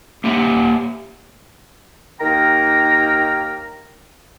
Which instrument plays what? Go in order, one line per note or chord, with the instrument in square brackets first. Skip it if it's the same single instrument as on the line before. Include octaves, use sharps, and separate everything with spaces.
[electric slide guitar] A#3 G4 E5 F#5
[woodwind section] D#2 D#3 A#3 A#4 G5 A#5